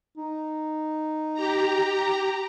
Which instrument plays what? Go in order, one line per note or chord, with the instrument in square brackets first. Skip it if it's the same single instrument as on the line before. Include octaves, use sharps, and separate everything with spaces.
[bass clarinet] D#4
[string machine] G4 A#5